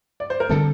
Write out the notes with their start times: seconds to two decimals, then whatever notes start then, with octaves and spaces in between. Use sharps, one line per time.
0.20 D5
0.30 C5
0.40 A#4
0.49 D3 G3 C4 A4